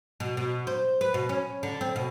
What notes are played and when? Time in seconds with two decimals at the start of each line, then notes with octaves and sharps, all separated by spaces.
0.20 B2
0.37 B2
0.67 C5
1.01 B4
1.14 B2
1.29 C#4
1.63 D3
1.81 C4
1.96 B2